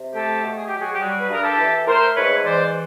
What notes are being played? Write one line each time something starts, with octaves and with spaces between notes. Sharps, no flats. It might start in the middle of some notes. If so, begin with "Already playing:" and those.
Already playing: C3
A3 G4 A4
B2
G#4
F#3 G4
F#4 G#4
G4
G3 F#4 G#4
B4
G2 A#4
G4 A4
E3
A3 A#4 C5
G#2 B4 C#5
E3 C5 D5